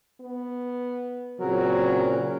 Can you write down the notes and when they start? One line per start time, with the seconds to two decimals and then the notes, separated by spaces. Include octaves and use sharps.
0.20 B3
1.40 A#2 C#3 F#3 C4 A#4